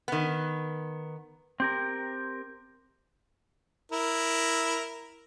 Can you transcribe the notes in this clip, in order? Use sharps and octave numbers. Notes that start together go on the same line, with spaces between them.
D#3 B3
C4 G4 A#4
E4 A#4